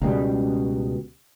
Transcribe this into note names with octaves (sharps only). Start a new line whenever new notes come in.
C#2 B2 G3